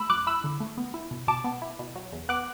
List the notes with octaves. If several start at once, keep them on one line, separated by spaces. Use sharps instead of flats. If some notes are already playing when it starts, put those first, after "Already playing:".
Already playing: A3 B5 E6
F#2 D6 F#6
E4 B5 E6
D3
A3
B3
E4
B2
B2 A5 D6
B3
E4
B2
F#3
E2
B3 D6 F#6